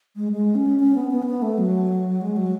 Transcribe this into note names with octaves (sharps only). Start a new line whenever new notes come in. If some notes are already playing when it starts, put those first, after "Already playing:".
G#3
G#3
C#4
C#4
B3
B3
C#4
B3
A3
F#3
G#3
F#3